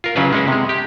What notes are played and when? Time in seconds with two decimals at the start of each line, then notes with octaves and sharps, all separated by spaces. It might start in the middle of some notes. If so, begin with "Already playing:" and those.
0.04 F4 A#4
0.16 C#3 F#3 C#4 E4 F4 B4
0.32 G#3 C#4 E4
0.48 C3 G#3
0.69 G4